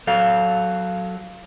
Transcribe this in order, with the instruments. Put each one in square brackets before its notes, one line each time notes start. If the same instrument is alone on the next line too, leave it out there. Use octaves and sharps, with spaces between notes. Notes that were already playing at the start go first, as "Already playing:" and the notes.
[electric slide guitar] F#3 A4 F5